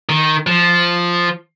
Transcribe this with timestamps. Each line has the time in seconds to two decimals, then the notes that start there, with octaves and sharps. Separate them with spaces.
0.09 D#3
0.47 F3